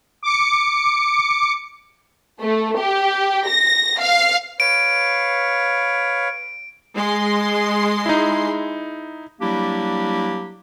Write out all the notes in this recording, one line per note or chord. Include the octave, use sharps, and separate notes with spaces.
D6 C#7
A3
G4
A#6
F5
B4 C#5 F5 D7
G#3 C6
D#4 E4
F#3 G3 A#3 D4 E4 G4